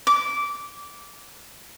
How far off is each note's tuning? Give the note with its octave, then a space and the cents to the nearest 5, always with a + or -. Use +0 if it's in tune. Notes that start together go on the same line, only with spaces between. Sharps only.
D6 -15